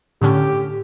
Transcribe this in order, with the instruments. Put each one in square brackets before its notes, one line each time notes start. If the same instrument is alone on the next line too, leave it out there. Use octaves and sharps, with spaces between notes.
[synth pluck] A2 D3 C#4 [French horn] G4